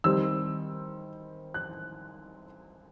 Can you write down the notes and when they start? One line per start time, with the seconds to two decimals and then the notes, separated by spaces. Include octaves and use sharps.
0.04 D#3 G3 C4 E6
1.54 F#6